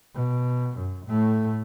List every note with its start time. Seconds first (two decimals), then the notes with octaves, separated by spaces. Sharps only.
0.15 B2
0.78 F#2
1.07 A2 A3